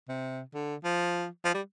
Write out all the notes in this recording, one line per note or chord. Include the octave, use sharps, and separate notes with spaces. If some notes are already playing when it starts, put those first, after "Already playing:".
C3
D3
F3
F3
G3